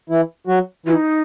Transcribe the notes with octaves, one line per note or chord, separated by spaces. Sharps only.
E3 E4
F#3 F#4
E3 E4 F4
D#4